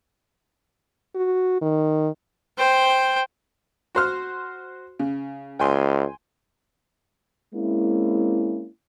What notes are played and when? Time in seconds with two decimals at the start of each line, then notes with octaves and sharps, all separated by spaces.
1.15 F#4
1.62 D#3
2.58 C5 G5
3.95 F#4 C5 F6
4.99 C#3
5.59 C#2 G5 G#5 C6
7.55 G#3 A#3 C4 C#4 E4